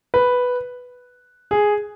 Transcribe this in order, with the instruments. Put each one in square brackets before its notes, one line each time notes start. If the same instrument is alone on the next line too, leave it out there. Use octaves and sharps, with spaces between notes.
[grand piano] B4
G#4